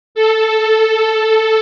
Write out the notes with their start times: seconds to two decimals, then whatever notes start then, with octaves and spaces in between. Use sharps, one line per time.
0.15 A4